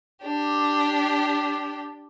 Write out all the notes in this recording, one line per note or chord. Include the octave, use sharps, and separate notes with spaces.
D4 G4